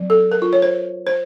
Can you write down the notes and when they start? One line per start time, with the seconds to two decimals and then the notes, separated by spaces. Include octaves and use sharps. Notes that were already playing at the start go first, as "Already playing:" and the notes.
Already playing: F#3 C4
0.10 A4
0.32 A#4
0.42 F4
0.53 C#5
0.62 C5
1.07 C5